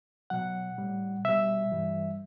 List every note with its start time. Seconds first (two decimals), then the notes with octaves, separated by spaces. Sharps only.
0.30 B2 F#3 F#5
0.78 A2 G3
1.25 B2 G3 E5
1.72 G2 E3 G3